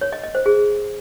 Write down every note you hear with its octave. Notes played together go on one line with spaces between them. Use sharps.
C#5
D#5
D#5
C5
G#4